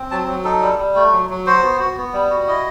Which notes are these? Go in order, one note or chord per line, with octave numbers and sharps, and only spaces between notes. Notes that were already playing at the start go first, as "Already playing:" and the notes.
Already playing: C4
F#3 A5
F#3
D#4 A4
G3
G3
A3
F#3
F#3
F#4 C5
B3
F#4
B3
G3
F#4
E4 D#5